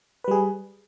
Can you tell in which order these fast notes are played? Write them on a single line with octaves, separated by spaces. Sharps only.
B4 G3 G#4